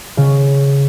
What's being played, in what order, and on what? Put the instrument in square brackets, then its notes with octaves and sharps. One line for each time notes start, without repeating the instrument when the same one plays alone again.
[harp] C#3